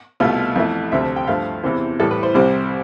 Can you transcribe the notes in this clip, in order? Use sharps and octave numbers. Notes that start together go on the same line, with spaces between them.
C2 B2 A3 F4
F2 E3 A3
D2 C3 F3 A3 E5
G5
G2 F3 A3 F5
E2 C3 E3 C5
A2 E3 G3 A4
B4
C5
C2 C3 G3 C5